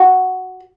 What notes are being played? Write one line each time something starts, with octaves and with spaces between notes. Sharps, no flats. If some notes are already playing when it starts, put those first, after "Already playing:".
Already playing: F#4